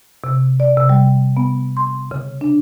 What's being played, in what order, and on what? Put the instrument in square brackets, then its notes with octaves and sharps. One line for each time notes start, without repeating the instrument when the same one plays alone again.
[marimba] C3
D5
C3
G3
B3
C6
C#3
D4